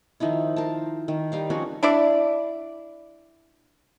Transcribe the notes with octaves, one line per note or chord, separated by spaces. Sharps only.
D#3 F3 D#4 E4
A#4 C5 A5
D#3
G3 D#4 F5
F3 C4 C#4 F#4
D4 E4 D5